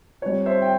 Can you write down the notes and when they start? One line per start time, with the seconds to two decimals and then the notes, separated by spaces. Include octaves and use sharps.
0.22 G3 C4 F4 C#5
0.46 C5 E5
0.62 G5